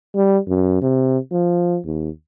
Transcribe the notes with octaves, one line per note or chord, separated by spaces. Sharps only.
G3
F#2
C3
F3
D#2